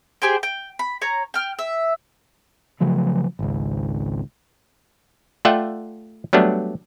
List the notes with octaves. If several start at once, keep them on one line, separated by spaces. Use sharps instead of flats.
G4 G#4 C5 G5
G5
B5
C#5 A#5
G5 F6
E5
C#3 F3 F#3 A3
G#1 C#2
A3 F4 D5 E5 F#5 G5
F#3 G3 A3 B3 D4